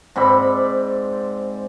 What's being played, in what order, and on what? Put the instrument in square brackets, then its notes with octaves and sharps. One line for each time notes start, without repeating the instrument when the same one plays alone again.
[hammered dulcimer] G#2 C4 D5 B5